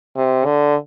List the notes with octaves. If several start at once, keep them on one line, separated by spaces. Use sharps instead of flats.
C3
D3